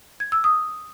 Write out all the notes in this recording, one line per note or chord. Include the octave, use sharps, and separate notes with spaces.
G#6
E6
D#6